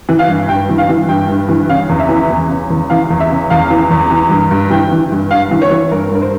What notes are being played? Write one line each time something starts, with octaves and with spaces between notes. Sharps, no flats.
E3
F5
G2
G2 G5
E3
F5
E3
G2 G5
G2
E3
C#3 F5
E2
E5
E3
E2
C#3
E2
E3 F5
E2
E5
C#3
E2 F5
E3
E2
E3
G2
G2
E3 G5
E3
G2
G2 F5
E3
C#5
E3
G2 A#4
G2 A#4
C5